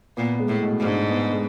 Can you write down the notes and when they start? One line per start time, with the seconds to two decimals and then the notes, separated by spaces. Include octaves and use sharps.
0.17 A#2 B3
0.39 G#3
0.48 A2
0.63 B2
0.79 G#2
0.87 D4
1.10 B3
1.33 G#3